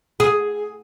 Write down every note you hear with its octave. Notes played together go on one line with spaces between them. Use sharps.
G#4